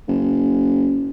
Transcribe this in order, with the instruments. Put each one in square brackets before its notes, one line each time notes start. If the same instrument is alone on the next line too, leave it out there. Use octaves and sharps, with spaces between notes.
[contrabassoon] F#1